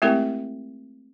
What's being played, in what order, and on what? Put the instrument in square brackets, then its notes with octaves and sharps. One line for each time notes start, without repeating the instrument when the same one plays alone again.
[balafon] G#3 A3 C4 E4 G4 A#4